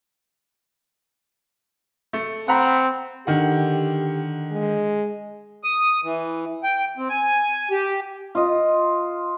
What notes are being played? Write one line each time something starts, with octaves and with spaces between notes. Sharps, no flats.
A3
C4 F#5 A#5 B5
D3 D#3 G4 F#5
G#3
D#6
E3
G5
C4
G#5
G4
F4 D#5